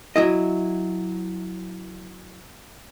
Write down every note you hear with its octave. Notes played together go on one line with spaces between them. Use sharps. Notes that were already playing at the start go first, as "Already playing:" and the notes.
F#3 E4 D#5